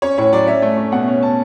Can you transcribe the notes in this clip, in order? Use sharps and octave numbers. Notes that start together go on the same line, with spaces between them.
C#4 C#5
A2 C#5
F#3 D5
C#4 E5
A3
C#4
B2 F#5
C#4
A5